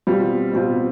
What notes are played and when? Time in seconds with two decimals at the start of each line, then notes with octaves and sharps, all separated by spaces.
0.07 B2 G3 C4 F4
0.53 B2 G3 C4 F4